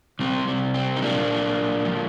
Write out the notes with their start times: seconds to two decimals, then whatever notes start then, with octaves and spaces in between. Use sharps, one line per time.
0.19 C3 G3 C4
0.48 C4
0.74 C4
0.96 D#4
1.02 A#2 G3 A#3 D4
1.85 D3 F3